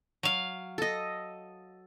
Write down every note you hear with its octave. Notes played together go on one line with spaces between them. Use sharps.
F#3 F5
A4 D#5